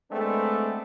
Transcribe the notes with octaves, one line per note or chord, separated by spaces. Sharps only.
G#3 A3 B3 C4 D4